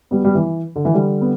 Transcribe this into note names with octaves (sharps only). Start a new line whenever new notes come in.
G3 B3
G3
E3
D3
E3
D3 G3
B3